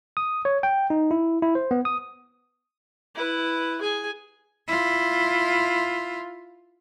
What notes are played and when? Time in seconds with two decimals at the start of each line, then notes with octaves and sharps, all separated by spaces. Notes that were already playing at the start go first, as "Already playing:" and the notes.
0.17 D#6
0.45 C#5
0.63 G5
0.90 D#4
1.11 E4
1.42 E4
1.55 C5
1.71 B3
1.85 D#6
3.15 E4 B4
3.81 G#4 G#5
4.68 E4 F4